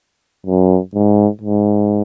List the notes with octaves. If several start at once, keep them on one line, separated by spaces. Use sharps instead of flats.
F#2
G#2
G#2